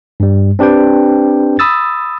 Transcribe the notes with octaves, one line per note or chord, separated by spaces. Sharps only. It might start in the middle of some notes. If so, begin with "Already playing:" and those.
G2 G3
C4 D4 G4 B4 G5
B5 D#6 E6 A6